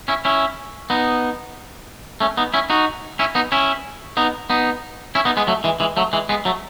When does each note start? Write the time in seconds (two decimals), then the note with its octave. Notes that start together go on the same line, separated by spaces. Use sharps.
0.08 C#4 E4
0.25 C#4 E4
0.90 B3 D#4
2.20 A3 C#4
2.37 B3 D#4
2.54 C#4 E4
2.70 D#4 F#4
3.19 C#4 E4
3.35 B3 D#4
3.52 C#4 E4
4.17 B3 D#4
4.50 B3 D#4
5.15 C#4 E4
5.25 B3 D#4
5.37 G#3 B3
5.47 F#3 A3
5.64 E3 G#3
5.80 E3 G#3
5.97 F#3 A3
6.13 E3 G#3
6.29 G#3 B3
6.45 F#3 A3